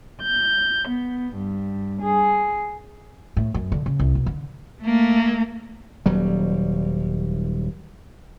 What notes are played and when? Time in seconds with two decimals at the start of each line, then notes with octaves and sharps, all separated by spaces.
0.22 G6
0.87 B3
1.34 G2
2.00 G#4
3.37 A2
3.54 F#2
3.72 D3
3.86 C#3
4.00 C2
4.15 B2
4.26 D3
4.82 A3 A#3
6.06 D#1 F#3 G3